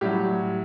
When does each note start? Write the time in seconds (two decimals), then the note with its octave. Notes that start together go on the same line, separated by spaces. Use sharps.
0.01 A2 F#3 G3 G4